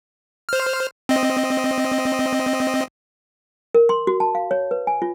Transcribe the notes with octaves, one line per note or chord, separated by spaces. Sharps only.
C5 F6
C4 D#5
A#4
C6
F#4
A5
F5
C#5
B4
G#5
F4